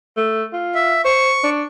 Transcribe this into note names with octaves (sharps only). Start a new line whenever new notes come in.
A3
F4
E5
C5 C#6
D4